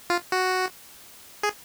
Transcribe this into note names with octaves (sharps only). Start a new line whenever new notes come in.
F4
F#4
G#4